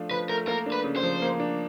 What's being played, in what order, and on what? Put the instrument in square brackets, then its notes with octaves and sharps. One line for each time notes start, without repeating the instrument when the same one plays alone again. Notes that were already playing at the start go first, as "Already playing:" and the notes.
Already playing: [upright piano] F3 A3 D4 F4
[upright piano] F3 [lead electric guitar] B4
[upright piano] A3 [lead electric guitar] A#4
[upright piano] A#3 [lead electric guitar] A#4
[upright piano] D4
[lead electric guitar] B4
[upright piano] C#3
[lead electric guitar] C5
[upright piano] F3
A#3
D4